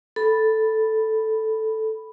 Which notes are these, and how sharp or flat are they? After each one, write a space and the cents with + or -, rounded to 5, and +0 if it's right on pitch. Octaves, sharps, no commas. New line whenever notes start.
A4 +0 B5 +0